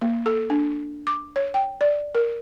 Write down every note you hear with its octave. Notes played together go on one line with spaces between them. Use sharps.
A#3
A4
D4
D6
C#5
G5
D5
A#4